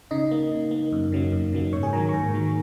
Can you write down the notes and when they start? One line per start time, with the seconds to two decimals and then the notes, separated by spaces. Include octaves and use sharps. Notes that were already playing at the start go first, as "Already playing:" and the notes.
0.11 C#3 D#4 D#5
0.31 A#3
0.51 C#3
0.71 A#3
0.92 F#2
1.12 C#3 F#3 A#3
1.33 F#2
1.53 C#3 F#3 A#3
1.73 G#2 C#5 C#6
1.83 G#4 G#5
1.93 D#3 F#3 A#3 A#4 A#5
2.09 C#6
2.13 G#2 A#4 A#5
2.34 D#3 F#3 A#3